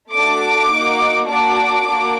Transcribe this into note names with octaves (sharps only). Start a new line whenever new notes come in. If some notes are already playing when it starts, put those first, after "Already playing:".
A3 D4 F#4 D6
A#3 D#4 F#4
A#3 D4 F#4 D6
A#3 D4 F#4